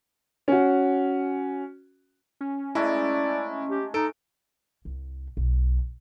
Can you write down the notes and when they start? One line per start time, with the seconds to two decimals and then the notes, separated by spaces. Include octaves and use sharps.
0.48 C#4 F#4
2.41 C#4
2.75 G#3 A3 D#4 E4 D5
3.69 G4
3.94 D#4 A4 D7
4.85 C2
5.37 B1